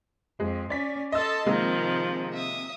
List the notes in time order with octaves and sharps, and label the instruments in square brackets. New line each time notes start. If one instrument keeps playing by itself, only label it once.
[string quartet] F2 [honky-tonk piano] G#3
[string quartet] C#4 [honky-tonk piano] D5 B6
[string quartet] A4 A5 C6 [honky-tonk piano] D#5 E6
[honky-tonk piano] C3 G#3 A#3 [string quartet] D#3 F3
[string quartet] E5 D#6